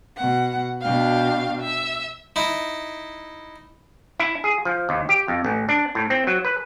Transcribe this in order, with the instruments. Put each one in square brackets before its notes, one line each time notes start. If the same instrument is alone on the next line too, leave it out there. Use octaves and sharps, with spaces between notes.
[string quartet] B2 F#5
B2 D4 F5 G5
E5
[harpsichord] D#4 E4
[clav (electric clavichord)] E4
G#4
F3
D#2
G4
F2
A1
D4
A2
C4
F#3
B4